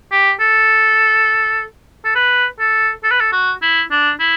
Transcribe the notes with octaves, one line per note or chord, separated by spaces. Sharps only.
G4
A4
A4
B4
A4
A4
B4
A4
F#4
E4
D4
E4